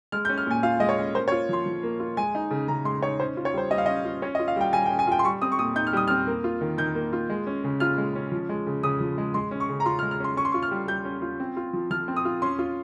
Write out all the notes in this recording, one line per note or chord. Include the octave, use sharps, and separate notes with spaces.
G#3 F6
G6
C#4
F6
A#2 G#5
F4 F5
G#3 D#5
C#5
C#4
A#3 C5
C#5
F4
F3 C6
F3
A#3
F4
G#3 G#5
D#4
C#3
C#3 A#5
G#3 C6
D#4 C#5
C#4 C5
F4
C#5
G3 C5
G3 D#5
F5
C#4 D#5
F4
C#4 C#5
D#5
F4
F5
G3 G5
G3 G#5
G5
C#4
G#5
F4 G5
C6
G3 C#6
C4 D#6
C#6
A#2 D#6
D#4 G6
F6
G3 D#6
C4 F6
A#3
F4
D#3
D#3 G6
A#3
F4
G#3
C#4
C#3
F4 F6
G#3
C#4
F3
G#3
C#3
C#3 D#6
F3
G#3
G#3 C6
C#4
C#6
C#3
A#5
F4 C6
F6
G#3
F6
C#4 C6
C#4 C#6
C6
F4 C#6
F6
G3
G3 G6
C#4
F4
C4
F4
F3
F3 F6
C4
D#6
F4
C#4 C6
F4